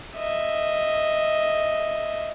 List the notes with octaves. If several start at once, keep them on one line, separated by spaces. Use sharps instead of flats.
D#5 E5